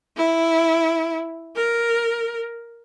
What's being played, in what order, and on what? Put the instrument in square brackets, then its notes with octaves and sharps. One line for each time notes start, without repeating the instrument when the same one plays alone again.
[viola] E4
A#4